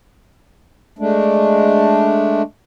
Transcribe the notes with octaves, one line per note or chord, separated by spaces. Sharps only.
G#3 A3 D4